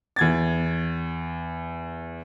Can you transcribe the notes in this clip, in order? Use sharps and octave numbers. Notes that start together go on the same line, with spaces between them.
E2 G#6 A6